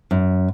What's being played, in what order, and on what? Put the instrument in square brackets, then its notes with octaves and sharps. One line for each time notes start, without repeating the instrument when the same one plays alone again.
[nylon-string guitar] F#2